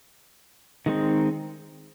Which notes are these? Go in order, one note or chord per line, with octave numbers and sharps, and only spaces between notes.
D#3 G#3 C4 D#4